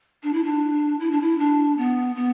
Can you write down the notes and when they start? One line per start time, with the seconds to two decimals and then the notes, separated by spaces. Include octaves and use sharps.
0.23 D4
0.33 E4
0.44 D4
1.00 E4
1.11 D4
1.21 E4
1.38 D4
1.77 B3
2.16 B3